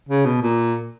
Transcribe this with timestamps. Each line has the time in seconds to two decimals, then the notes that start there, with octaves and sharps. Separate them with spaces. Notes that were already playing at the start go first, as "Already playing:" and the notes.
0.09 C#3
0.25 B2
0.42 A#2